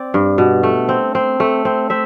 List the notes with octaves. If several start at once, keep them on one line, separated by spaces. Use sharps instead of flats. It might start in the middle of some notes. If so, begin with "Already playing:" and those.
Already playing: C4 D5
G2
B2
A3
C4
C4
A3
C4
C4 E5